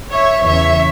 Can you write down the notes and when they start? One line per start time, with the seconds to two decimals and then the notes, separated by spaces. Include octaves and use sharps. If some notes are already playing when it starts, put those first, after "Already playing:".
0.12 C#5 E5
0.46 E2 C#3 E3 C#5 E5